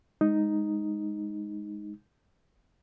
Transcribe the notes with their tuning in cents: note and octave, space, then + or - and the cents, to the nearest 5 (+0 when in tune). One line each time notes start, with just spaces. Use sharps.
G#3 -5 D#4 +0